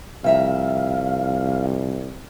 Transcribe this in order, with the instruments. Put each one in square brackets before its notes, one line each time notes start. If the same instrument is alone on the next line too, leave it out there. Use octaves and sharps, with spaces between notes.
[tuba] C2 [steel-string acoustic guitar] F2 E5 A#5 [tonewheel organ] F5